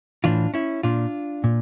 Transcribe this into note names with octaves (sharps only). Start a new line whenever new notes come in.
A2 E3 D4 F4
C#4 E4
A#2 D4 F4
A#2